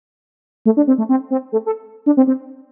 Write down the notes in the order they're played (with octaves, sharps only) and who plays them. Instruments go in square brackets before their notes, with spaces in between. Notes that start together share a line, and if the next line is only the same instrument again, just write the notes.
[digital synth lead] A3
D4
C4
A3
C4
C4
A3
A4
D4
C4
C4